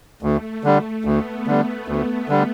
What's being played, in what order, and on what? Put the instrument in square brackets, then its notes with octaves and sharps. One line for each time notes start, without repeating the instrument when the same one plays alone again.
[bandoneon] D2 [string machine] A3
[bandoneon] D3 G3 [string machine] A3
[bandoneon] D2 [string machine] B3
[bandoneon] D3 G3
D2
D3 G3